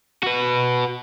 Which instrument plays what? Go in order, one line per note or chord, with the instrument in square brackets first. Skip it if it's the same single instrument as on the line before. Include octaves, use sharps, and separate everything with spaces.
[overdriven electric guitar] F#4 B4